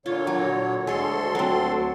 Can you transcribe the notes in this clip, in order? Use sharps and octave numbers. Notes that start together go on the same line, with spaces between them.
A#2 D3 F4 C#5
F#3
D2 G#3 A4 C#5 C6
F#3 C4